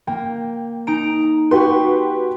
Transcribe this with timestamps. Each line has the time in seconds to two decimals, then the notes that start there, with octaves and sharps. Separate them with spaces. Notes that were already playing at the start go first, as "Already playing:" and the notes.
0.07 A#3 G5
0.87 D#4 A#5 D7
1.51 F#4 G4 B4 C6 C#6